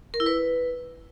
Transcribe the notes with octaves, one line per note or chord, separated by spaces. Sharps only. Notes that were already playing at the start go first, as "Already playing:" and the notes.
A#4
E4
B4